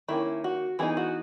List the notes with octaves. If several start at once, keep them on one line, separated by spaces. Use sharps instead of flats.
D#3 A#3 C#4 E4
F#4
E3 B3 D#4 G#4
F#4